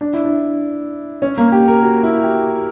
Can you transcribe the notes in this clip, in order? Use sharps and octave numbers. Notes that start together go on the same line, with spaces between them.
D4
E4
D4
C#4
A#3
G4
A#4
F#4
E4
G4